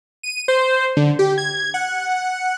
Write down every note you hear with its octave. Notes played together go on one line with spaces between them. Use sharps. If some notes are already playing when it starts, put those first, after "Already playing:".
D#7
C5
D3
G4
G#6
F#5